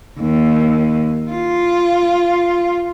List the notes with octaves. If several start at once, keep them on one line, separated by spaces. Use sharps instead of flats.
D#2
F4